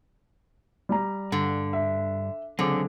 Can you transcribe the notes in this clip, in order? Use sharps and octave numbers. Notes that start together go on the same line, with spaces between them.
G3 D5 A#5
G2 D3
E5
C#2 D3 F#3 C4 G#4 D6